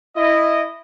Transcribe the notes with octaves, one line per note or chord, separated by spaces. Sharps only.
E4 D#5